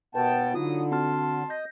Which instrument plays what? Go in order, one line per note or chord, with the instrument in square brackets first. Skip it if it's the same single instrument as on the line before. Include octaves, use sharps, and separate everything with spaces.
[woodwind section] D#2 B2 [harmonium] B3 G5 A5 [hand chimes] B4
[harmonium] D3 [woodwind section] F#3 D#6 [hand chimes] D#4 F4
[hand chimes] C4 F#4 F6 [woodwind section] A5 C6
[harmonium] D#5 [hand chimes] G6 A#6